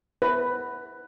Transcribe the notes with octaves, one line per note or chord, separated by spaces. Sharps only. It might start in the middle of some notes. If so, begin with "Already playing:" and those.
B4